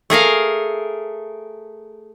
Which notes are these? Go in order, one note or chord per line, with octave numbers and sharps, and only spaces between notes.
A3 G#4 A#4 F5